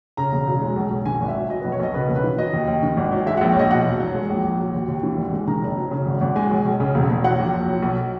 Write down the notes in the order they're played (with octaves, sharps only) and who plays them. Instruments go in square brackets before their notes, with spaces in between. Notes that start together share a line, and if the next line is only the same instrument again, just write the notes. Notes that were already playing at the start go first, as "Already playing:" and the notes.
[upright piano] C#3 A#5
E1
F#3
G#3
B1
B1
D#3 G#5
G#1
E5
F#3
F#3 D#5
B4
B1
C#5
B1 D#5
C#3 B4
E1
B4
E3
F#3 D#5
D#2
D#2
D#3
G#1
F#3
G#3 E5
F#5
A#1
C#5
A#1 D#5
B2 F#5
E1
F#3
G#3
A#1
A#1
F#3
D#2
D#2
E3
G#1
G#3
D#3 A#5
F#1
F#3
C#3
G#1
G#1
G#3 G#5
B1
B1
C#3
E1
E1
F#3 F#5
A#1
A#1
F#3
B1